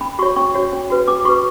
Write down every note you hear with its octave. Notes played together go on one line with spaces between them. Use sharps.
C#4 B5
F#4 C#5 C#6
C#4 C#6
F#4 C#5
C#4
F#4 B4
C#4 D6
F#4 B4 C#6